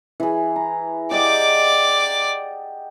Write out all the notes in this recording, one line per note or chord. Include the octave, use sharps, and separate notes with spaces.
E3 G#4
A#5
G4 D5 D#5 F#5 D6